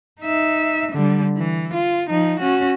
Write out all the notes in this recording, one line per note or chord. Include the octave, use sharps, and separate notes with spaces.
D#4 E5
D3 G3
E3
F4
F3 D#4
C#4 F#4